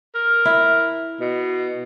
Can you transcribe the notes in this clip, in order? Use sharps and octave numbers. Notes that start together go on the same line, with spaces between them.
A#4
E4
B2